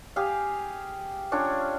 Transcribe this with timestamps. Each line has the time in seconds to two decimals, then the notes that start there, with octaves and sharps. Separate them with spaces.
0.16 G4 G#4 F5
1.32 C#4 D4 F4 C#5